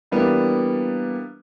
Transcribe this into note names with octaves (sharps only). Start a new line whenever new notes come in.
E3 G3 A#3 B3 D4